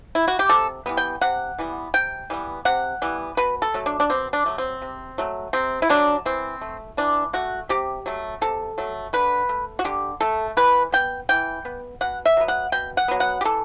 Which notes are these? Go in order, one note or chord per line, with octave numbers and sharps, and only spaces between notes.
E4
F#4
G4
C3 A4
E3 G3 B3
G5
C3 F#5
E3 G3 B3
C3 G5
E3 G3 B3
C3 F#5
E3 G3 B3
B2 B4
A4
F#3 A3
D4
D4
B2 C4
D4
F#3 A3
C4
C3
F#3 A3
C3 C4
E4
F#3 A3 D4
E3 C4
A3
E3 D4
A3 F#4
C3 G4
F#3 A3
C3 A4
F#3 A3
D3 B4
A3
F#4
D3 G4
A3 A4
E3 B4
B3 G5
E3 G5
B3
B2 F#5
E5
F#3 B3
F#5
B2 G5
F#5
F#3 B3
F#5
G4
E3 A4